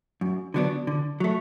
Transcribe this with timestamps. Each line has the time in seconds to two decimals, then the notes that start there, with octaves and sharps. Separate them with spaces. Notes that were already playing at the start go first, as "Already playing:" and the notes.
0.21 F#2
0.54 D3 F#3 B3 D4
0.87 D3
1.20 F#3 A3